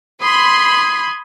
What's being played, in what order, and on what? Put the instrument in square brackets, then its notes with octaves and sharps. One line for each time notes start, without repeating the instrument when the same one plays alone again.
[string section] B5 C6 [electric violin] D#6 G#6